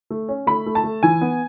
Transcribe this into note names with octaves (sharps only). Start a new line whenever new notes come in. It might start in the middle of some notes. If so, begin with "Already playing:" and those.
A3
C#4
A3 B5
A3
A5
A3
E3 G#5
B3